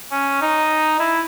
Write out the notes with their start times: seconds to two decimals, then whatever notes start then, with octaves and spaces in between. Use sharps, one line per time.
0.12 C#4
0.42 D#4
1.00 E4